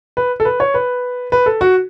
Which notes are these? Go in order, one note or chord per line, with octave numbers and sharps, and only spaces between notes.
B4
A4
B4
C#5
B4
B4
A4
F#4